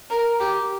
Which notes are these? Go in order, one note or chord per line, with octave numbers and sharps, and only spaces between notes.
A#4
G4